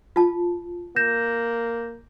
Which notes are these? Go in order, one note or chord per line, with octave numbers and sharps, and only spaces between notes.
F4 A5
A#3 G6 A#6 E7